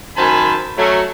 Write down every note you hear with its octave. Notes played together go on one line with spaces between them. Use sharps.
F#2 D#3 C5 G#5 A5 B5
F#3 A3 C#4